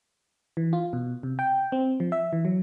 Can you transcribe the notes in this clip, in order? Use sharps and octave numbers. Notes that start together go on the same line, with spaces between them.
E3
F4
B2
C3
G5
C4
F3
E5
E3
F#3